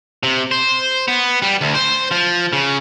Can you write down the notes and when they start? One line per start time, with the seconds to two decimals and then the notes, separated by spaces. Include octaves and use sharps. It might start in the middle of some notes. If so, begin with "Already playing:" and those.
0.23 C3
0.51 C5
1.08 B3
1.42 G3
1.61 D2
1.75 C5
2.11 F3
2.53 C#3